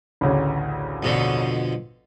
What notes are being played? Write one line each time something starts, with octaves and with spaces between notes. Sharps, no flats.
A1 D2 C#3
F2 B2 D3